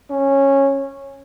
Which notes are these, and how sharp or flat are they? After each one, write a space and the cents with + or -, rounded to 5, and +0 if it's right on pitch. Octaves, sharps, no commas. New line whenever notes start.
C#4 -10